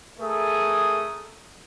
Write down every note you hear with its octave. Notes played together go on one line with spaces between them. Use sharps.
A3 G#4 A#4 D#6